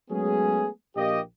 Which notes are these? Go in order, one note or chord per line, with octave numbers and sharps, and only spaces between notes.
F#3 G#3 A3 B3 C#4 G#4
A#1 A#3 G4 D#5